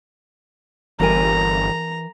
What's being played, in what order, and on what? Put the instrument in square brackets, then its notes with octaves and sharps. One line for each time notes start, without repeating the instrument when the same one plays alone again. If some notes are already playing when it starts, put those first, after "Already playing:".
[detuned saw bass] G1 [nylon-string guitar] E3 A#4 G#5 [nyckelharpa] A#5